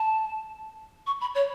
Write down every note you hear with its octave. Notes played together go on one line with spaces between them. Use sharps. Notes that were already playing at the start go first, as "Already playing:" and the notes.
Already playing: A5
C#6
B5
C#5